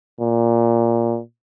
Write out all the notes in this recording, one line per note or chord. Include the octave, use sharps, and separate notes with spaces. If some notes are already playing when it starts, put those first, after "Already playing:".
A#2